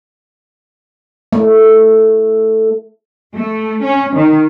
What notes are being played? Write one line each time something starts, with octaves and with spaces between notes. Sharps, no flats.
A3
A3
C#4
D#3